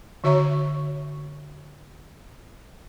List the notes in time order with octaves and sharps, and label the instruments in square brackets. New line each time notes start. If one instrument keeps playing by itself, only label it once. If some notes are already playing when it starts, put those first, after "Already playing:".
[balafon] D3 F#4 C#5 E5 A#5 C#6